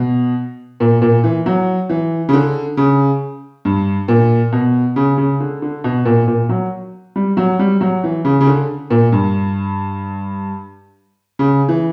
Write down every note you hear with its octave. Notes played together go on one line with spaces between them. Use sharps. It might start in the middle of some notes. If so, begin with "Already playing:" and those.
Already playing: B2
A#2
A#2
E3
F#3
E3
C#3
D3
C#3
G2
A#2
B2
C#3
C#3
D3
D3
B2
A#2
A#2
F#3
G3
F#3
G3
F#3
E3
C#3
C#3
D3
A#2
G2
C#3
E3